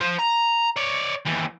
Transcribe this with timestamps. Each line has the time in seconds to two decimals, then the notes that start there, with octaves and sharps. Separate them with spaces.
0.01 F4 C5
0.19 A#5
0.76 C#5 D5
1.25 D#2 E3